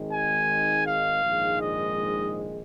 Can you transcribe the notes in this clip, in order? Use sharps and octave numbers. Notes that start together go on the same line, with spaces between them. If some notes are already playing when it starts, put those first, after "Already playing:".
Already playing: G#1 G#2 D#3 G#3
G#5
F5
A#1 G#2 D#3 G#3
D#5